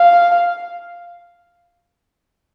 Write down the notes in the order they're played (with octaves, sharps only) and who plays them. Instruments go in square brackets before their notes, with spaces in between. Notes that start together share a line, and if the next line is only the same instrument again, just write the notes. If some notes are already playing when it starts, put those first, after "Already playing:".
Already playing: [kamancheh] F5